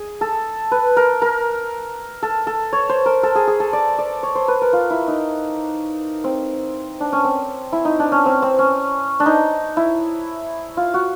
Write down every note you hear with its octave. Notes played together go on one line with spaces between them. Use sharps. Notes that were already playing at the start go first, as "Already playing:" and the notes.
Already playing: G#4
A4
B4
A#4
A#4
A4
A4
C#5
C5
A#4
A4
G#4
G#4
A4
D5
D5
C#5
C5
B4
A#4
F4
E4
D#4
C4
D4
C#4
C4
E4
D#4
D4
C#4
C4
C4
C#4
D4
D#4
E4
F4
F#4